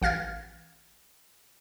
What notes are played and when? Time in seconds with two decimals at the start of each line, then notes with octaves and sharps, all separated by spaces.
0.02 A1 F5 F6 G#6 A6